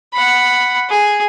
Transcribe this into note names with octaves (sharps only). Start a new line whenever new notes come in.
F#5 B5
G#4